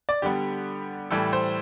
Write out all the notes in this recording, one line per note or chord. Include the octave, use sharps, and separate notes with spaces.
D5
D3 G3 B3 G4
A2 E3 G3 A4
C5